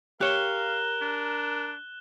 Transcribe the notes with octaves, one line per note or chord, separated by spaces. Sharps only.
G4 A#4 C#5 F5 F#6 E7 G7
D4